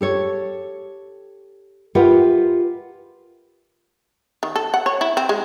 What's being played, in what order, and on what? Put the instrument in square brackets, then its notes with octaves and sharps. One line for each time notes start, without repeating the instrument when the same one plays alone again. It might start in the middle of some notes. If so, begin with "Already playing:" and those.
[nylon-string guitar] G4 A4 C#5
F4 G4 A#4 B4 E5 F#5
[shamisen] D#3
A4
F#5
C#5
E4
C4
G#3